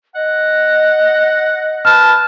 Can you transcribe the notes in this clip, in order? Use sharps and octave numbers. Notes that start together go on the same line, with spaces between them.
D#5 F#5
B4 A5 F6